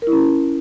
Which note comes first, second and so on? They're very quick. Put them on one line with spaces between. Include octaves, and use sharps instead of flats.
A#4 E4 C#4